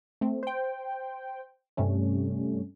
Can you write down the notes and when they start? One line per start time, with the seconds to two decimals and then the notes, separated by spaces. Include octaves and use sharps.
0.21 A3 C4
0.43 C5 G5
1.77 G2 C3 G3 A3 C#4